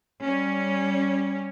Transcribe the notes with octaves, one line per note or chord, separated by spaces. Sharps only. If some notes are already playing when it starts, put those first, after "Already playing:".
G3 C#4